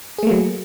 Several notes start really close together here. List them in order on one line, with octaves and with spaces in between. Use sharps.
G#4 A3 A#3 F#3